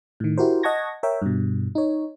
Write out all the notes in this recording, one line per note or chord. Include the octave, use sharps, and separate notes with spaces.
A2 D#3
E4 F#4 G4 A#4 C5
D#5 F#5 A5 C#6 G#6 A#6
A#4 C#5 E5 G5
G2 B2
D#4 C#5